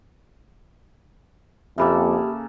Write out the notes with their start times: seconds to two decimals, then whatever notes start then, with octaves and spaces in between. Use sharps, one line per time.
1.78 F2 C#3 A#3 G4 A4 E5 B5 D6